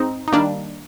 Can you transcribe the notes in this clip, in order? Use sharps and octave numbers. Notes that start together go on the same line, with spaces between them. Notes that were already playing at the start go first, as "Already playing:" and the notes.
Already playing: G#2 C4 D#4
D#4
D#3 G3 A#3 D4